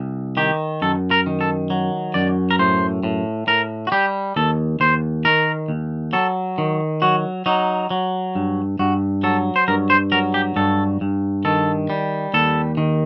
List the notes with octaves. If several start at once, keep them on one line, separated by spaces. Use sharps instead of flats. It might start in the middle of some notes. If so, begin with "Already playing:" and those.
Already playing: C2
D#3 G4
F#2 A4
A#4
D#3
A4
F#3
F#2 D5
A#4
A2 C5
A2
A2 A#4
F#4
G3 G4
D#2 A4
D#2 C5
D#3 A#4
D#2
F#3 A4
D#3
F#3 F#4
F#3 D#4
F#3
G2
G2 F#4
F#3 A4
C5
G2 A#4
C5
F#3 A#4
G4
G2 A4
G2
D#3 A4
G3
D#2 A4
D#3